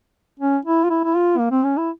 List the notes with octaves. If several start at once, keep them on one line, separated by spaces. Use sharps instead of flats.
C#4
E4
F4
E4
E4
F4
A#3
C4
C#4
E4